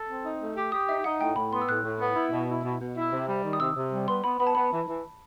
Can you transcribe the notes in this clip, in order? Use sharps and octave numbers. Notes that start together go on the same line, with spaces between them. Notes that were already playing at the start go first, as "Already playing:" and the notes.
Already playing: A4
C4
D#4
A3
G4
G4 D#6
D#4 E5
D#4 F#5
A2 G5
A2 B5
B3 C6
E6
A2 F#6
A2
B3
E4
B2
E4
B2
B2
E4
C3
G3
D#3
D#6
C3 E6
C3
G3
B3 C6
B3 B5
B3 B5
A5
B3 B5
E3
E3